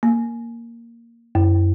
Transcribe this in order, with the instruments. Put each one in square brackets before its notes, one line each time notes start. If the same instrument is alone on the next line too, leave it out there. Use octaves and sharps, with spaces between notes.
[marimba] A#3
F#2